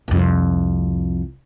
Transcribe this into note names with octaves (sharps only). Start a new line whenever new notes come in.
C2 F2